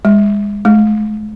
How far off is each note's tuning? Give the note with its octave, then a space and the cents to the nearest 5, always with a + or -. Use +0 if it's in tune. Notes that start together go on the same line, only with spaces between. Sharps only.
G#3 -30
G#3 +45